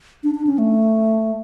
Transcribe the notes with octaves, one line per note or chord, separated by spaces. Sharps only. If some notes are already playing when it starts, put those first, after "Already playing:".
D4
D4
C#4
A3